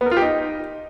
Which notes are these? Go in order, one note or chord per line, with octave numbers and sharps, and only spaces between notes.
B3
A#4
F4
G4
D#4